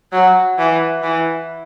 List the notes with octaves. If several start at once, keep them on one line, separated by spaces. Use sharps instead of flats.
F#3
E3
E3